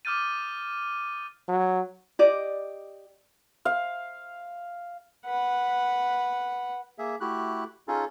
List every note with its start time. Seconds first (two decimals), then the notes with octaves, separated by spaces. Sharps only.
0.05 D6 D#6 F6 G6 A6 D#7
1.48 F#3
2.19 G4 D5 D#5
3.65 F5
5.26 B4 F#5
6.98 A#3 G#4 E5
7.20 A3 E4 F#4 G4 F#6
7.88 C#4 D#4 F4 G#4 A4